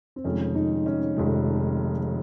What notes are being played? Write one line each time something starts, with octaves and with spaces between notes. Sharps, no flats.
C4
F1 F2 D#3 G#3 C#4
D#4
C#4
F1 F2 D#3 G#3